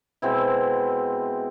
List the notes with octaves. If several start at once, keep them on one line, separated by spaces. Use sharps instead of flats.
B2 G#3 C4 E4